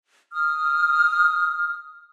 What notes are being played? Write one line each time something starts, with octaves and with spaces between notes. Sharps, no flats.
D#6 F6